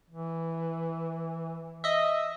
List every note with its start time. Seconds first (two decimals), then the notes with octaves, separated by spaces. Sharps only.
0.10 E3
1.84 D#5 E5